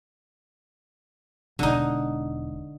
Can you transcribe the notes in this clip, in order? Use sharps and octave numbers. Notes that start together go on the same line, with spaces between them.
E1 D3 G#3 D#4